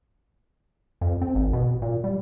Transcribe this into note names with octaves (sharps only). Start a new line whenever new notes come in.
F2
C4
G#1
B2
A#2
G3